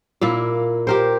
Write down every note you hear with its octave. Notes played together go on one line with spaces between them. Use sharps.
A#2 A#3 E4
G4 A#4 C5